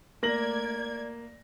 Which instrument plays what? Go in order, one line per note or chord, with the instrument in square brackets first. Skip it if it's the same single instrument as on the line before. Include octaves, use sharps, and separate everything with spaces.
[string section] A3 D5 G#6 [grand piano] A#3 A#6 F#7